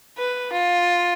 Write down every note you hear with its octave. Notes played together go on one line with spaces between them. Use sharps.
B4
F4